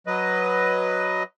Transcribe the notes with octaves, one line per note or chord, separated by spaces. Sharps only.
F#3 B4 D#5